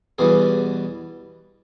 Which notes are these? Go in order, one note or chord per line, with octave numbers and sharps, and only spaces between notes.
E2 B2 G3 G#4